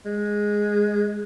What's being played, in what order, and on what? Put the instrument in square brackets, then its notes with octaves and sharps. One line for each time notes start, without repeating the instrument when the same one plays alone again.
[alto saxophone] G#3